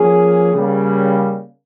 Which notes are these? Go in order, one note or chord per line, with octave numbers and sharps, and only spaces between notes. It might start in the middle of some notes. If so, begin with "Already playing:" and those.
Already playing: F3 A#3 C#4 G#4
C#3 G3 A#3